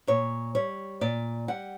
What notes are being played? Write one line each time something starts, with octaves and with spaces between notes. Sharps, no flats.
A#2 C#5
G3 C#5
A#2 D5
G3 F#5